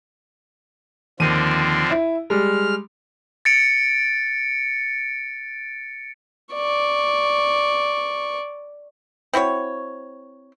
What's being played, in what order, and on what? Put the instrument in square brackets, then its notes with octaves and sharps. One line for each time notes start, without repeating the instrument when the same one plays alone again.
[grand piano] D#2 D#7 [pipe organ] D3 F3 C4
[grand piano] E4
[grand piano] G3 G#3 [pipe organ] F6
[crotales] A6 C#7 D7
[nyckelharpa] D5 C#6
[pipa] C4 E4 F#4 C#5